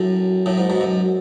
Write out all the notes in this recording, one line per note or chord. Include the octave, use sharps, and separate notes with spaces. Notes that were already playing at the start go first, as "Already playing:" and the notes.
Already playing: F#2 A2
F#2 A2
G#2
G#2 B2
F#2